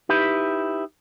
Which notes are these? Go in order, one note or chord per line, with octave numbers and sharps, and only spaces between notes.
D#4 E4 G4 B4